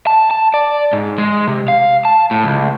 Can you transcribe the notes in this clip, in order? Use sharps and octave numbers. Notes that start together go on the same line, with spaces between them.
A5
A5
D5
G#2
G#3
C3
F5
A5
A2
C#2